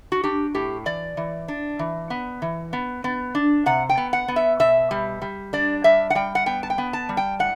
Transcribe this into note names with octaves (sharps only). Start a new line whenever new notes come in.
F#4
D4 G4
A2 G4
E3 D5
E3
D4
E3
B3
E3
B3
B3
D4
C3 F#5
G5
B3
F#5
B3
E5
B2 E5
G3
G3
D4 D5
G3 E5
F#5
G3 G5
F#5
B3 G5
A5
G5
B3
A5
G3
G5
A2 F#5